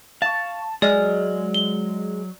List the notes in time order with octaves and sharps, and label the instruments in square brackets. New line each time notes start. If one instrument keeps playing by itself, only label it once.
[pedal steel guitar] F5 C#6 [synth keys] A5
[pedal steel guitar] F#3 F6 [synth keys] G#3 [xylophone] D5
[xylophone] G7